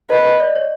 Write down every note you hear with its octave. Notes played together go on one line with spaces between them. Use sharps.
B4 D#5
D#5
D5
C#5